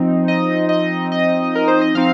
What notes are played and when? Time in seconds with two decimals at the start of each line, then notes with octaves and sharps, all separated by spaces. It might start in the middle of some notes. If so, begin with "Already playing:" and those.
Already playing: F3 C4 D#4
0.28 D#5
0.69 D#5
1.12 D#5
1.55 A#4
1.68 C5
1.81 D#5
1.95 F3 C4 D#4 F5